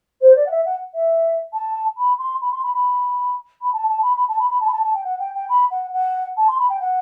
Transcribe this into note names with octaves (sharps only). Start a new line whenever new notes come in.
C5
D5
F#5
E5
F#5
E5
A5
B5
C6
B5
C6
B5
B5
B5
A5
A5
B5
B5
A5
B5
B5
A5
B5
A5
A5
G5
F#5
G5
G5
B5
F#5
F#5
A5
C6
B5
G5
F#5